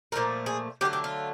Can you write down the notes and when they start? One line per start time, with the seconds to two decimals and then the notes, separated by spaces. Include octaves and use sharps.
0.12 A#2 F3 A3 A#4
0.46 G#4
0.81 D3 F#3 A3 G4
0.93 G4
1.04 F4